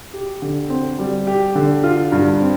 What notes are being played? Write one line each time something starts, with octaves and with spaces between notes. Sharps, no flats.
G4
D3
C4
G3
G4
D3
F4
G2
C4